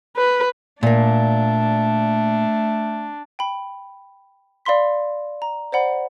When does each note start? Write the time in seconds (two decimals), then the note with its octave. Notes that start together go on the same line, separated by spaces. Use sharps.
0.17 B4
0.83 A#2 A3 A#3 D4
3.39 G5 B5
4.65 D5 F5 B5 C6 B6
5.42 A#5
5.72 C5 D5 F#5 B5